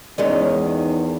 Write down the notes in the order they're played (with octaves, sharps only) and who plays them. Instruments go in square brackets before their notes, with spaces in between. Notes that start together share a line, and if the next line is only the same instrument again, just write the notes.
[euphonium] E2 [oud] D#3 G#3 C#4 [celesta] D5